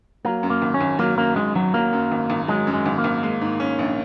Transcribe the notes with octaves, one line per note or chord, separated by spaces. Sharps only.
F#3 A#3
F#2
A#3
G#1
C#4
G#1
F#3 A#3
F#2 A#3
G#1 G#3
G#1 F#3
F#3 A#3
F#2
G#1
G#1
F#3 G#3
F#2
G#3
G#1
A#3
G#1
G#3
G#2
C#4
A#1